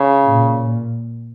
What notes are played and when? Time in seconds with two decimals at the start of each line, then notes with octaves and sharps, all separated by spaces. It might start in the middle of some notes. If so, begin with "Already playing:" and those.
Already playing: C#3
0.25 A#2